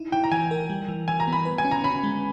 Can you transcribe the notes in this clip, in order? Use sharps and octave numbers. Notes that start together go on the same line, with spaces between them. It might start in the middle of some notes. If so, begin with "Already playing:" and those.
Already playing: D#4 E4
E4 G5
A#5
E3 G#5
A#4
G3
E3
E3 G#5
A#5
B3
B5
B4
G#5
C#4
A#5
C#4 B5
G#3